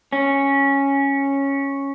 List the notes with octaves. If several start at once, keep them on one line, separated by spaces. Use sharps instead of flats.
C#4